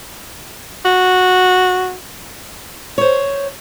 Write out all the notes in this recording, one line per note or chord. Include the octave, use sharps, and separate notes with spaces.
F#4
C5 C#5